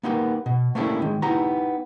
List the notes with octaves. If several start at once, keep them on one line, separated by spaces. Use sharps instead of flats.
A#3 B3 D#4 G4 G#4 A#4
B2
A3 A#3 C#4 D4 E4 G4
D#3 G#3
B3 D#4 E4 G4 A#5